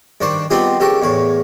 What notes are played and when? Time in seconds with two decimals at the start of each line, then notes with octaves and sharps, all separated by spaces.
0.21 G2 D#3 D4 C5 C#6
0.50 G3 B3 C4 D#4 F4 G4
0.80 C#2 G4 A4 A#4 C#6
1.02 E2 A2 C#5